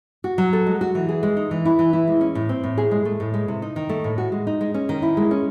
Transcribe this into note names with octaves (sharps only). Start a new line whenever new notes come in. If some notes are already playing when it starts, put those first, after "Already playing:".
F#4
F#3
A4
G#3
F#4
E3
G#4
G#3
D#4
E3
E4
E3
E4
G#3
C#4
A2
C4
A2
G#4
G#3
A3
A2
G#3
C3
D#4
D#3
A3
A2
F#4
G#3
D#4
G#3
C#4
D#3
E4
G#3
C#4